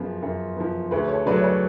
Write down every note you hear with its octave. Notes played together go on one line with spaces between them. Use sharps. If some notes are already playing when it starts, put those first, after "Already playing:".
Already playing: F#2 F3 B3 F4 G#4
F#2
F3 B3
D2 G#4 B4
A4 C#5
C#3 F#3 A3 B4 D5
C#5
B4 D5